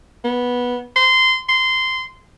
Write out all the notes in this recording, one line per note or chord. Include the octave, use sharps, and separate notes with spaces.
B3
C6
C6